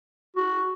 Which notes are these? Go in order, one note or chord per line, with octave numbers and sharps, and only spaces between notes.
F#4